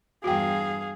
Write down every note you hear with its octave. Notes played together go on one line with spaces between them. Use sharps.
E2 G2 F#4 G#4 F5 G5